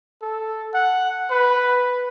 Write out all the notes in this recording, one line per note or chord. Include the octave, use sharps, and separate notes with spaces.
A4
F#5
B4